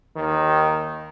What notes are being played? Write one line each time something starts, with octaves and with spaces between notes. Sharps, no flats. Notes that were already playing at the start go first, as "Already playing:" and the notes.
D#2 D#3